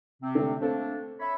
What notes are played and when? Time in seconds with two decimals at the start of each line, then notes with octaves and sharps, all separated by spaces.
0.22 C3 C4
0.35 D3 A3
0.61 A3 A#3 C4 D4 A4
1.20 C#5 E5 B5